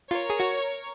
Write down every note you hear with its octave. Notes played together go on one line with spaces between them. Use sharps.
F4 A#4 C#5
G#4
F#4